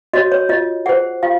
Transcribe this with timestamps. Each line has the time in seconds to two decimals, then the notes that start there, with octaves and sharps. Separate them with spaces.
0.14 F#4 C#5 D#5
0.32 C#5
0.49 F4 D#5
0.86 G#4 C5 F#5
1.23 F4 F5